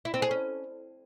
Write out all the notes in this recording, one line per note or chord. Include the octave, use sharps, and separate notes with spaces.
E4
C4
G#4
C#4